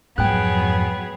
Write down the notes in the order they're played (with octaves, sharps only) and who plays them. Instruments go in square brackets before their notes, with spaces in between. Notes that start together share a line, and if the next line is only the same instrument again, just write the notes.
[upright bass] F2 G#2 [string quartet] F#3 B3 G#4 [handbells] G5 F#6